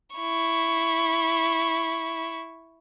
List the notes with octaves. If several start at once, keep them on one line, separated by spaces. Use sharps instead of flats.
E4 C#6